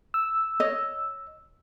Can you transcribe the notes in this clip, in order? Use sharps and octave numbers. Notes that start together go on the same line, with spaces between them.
E6
C#5 D#5